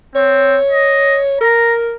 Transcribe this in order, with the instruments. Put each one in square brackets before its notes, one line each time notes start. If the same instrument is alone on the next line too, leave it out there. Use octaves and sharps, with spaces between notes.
[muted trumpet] C4 [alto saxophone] C#5
[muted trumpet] D#5
[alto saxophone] A#4 [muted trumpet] A#5